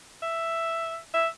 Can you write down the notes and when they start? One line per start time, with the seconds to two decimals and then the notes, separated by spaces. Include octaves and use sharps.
0.22 E5
1.14 E5